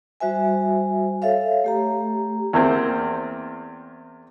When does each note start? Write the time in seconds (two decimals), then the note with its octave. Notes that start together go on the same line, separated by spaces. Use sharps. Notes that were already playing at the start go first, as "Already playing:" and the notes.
0.20 G3 F#4 C5 E5 G#5
1.22 A4 C#5 E5 F5
1.64 A3 G4 A#5
2.53 E2 A#3 C4